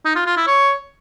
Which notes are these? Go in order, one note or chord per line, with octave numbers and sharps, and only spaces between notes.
D#4
F4
F4
E4
C#5